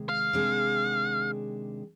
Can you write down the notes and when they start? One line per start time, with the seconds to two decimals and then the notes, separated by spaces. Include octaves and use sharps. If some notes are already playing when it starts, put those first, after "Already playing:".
Already playing: C3 D#3 G#3
0.09 F5
0.33 C3 D#3 G#3 D4 G#4